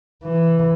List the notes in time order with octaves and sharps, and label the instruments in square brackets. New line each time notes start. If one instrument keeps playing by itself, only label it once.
[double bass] E3